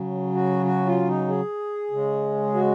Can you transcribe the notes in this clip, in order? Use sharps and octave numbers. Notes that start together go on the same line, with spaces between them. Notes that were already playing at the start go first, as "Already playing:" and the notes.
Already playing: C#3 F#3
F#4
F#4
F4
D#4
G#4
C#3 G#3
F#4